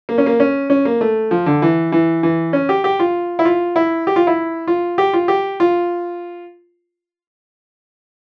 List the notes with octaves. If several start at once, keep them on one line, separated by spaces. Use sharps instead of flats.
A#3
C#4
A#3
C#4
C#4
A#3
A3
F3
D3
E3
E3
E3
C#4
G4
G4
F4
E4
F4
E4
G4
F4
E4
F4
G4
F4
G4
F4